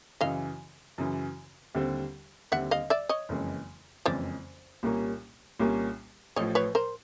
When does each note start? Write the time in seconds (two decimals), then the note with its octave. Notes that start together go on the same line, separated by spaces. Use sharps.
0.21 F#2 C#3 E3 D#5 F5
0.98 F#2 C#3 E3
1.75 D#2 D3 G3 C4
2.52 D#2 D3 G3 C4 E5 F#5
2.71 D#5 F5
2.90 D5 E5
3.09 C#5 D#5
3.29 F#1 F2 C#3 E3 G#3
4.05 F#1 F2 C#3 E3 G#3 C5 D5
4.83 C2 A#2 G3 A#3 C#4
5.59 C2 A#2 G3 A#3 C#4
6.36 A1 A2 F3 C#5 D#5
6.55 B4 C#5
6.75 A#4 C5